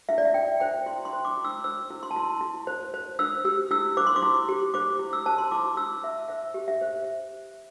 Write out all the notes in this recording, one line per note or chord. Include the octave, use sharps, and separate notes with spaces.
E4 E5
D5
E5
E4 G5
C5 G5
E4 C6
C6
C5
D6
E4
E6
C5 E6
E4
C6
A5
E4 C6
E4
C5
C5
C5 E6
G4 E6
E4 E6
C5 D6
C6
D6
E4
G4
C5 D6
E4
E6
C5 A5
C6
E4 D6
E4 E6
C5 E5
C5 E5
G4
E5
C5